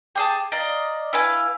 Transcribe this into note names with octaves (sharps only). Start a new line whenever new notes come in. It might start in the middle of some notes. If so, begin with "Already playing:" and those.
G4 G#4 A5
D5 D#5 F5 A#5
E4 B4 F5 G#5